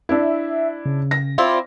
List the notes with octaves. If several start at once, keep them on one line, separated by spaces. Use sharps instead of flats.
D4 E4 E5
C#3
A#6
C4 E4 F4 D5